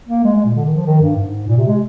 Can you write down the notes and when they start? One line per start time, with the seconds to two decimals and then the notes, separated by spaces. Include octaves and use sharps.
0.08 A#3
0.24 G#3
0.35 G#3
0.45 A#2
0.55 D3
0.65 D#3
0.75 F3
0.86 D#3
1.01 G2
1.16 G#2
1.47 A#2
1.57 C3
1.67 G#3